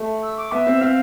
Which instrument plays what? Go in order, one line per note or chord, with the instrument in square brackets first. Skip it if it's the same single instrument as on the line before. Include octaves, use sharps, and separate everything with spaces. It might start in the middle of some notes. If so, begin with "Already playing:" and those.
Already playing: [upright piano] A3
[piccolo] E6
D6
[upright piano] B3 [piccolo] E5
[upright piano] C4
[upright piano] C4 [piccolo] F5